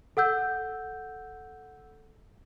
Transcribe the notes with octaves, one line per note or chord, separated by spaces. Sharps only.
A4 F#5 E6 G6